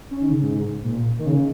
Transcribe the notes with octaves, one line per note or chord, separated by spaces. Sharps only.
C#4
D#3
C#3
G#2
A#2
D#3
C#3